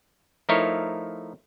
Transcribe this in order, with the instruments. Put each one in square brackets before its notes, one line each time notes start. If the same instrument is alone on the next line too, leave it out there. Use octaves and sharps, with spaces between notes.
[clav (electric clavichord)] F3 A3 D#4 E4 A#4 C#5